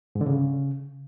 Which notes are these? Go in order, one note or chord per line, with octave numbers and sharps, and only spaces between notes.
G#2
D3
C#3